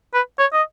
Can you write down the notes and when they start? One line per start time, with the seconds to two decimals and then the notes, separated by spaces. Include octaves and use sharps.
0.14 B4
0.39 C#5
0.53 D#5